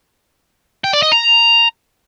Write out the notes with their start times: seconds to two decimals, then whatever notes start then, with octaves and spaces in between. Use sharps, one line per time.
0.84 G5
0.93 D5
1.03 D#5
1.12 A#5